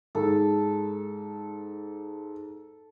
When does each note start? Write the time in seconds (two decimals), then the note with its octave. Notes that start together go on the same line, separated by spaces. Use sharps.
0.15 G#2 A4